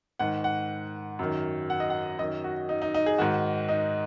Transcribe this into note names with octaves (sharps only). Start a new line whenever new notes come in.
G#2 D#3 F#5
F#5
F#2 D#3
F#5
D#5
F#5
F#2 D#3 D#5
F#4
D#4
D#4
D#4
G#4
G#2 D#3 F#4
D#4